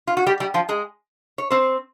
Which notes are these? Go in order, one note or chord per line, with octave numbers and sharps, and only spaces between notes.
F4
F#4
G3 G4
G3 G4
F3 F4
G#3 G#4
C#5
C4 C5